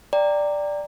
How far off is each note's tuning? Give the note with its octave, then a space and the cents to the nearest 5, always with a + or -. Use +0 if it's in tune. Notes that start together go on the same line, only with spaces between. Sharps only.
D5 +0 G5 +10 A#5 -15